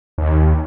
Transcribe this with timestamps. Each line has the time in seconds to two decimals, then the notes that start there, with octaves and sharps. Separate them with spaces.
0.18 D#2